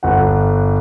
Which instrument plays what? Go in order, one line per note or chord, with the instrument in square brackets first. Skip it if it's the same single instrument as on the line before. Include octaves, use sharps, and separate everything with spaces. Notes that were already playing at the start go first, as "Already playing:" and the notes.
[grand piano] G1 F#5